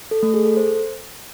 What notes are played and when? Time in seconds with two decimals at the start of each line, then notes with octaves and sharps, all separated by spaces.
0.11 A4
0.23 A3
0.34 G#4
0.45 A4
0.57 C5